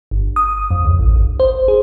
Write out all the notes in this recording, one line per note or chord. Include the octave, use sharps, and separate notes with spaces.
G1
D#6
F2
C#2
A1
G1
C5
G#4